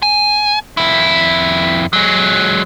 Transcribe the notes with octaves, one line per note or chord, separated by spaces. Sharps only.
G#5
F2 E4
F#3 G#3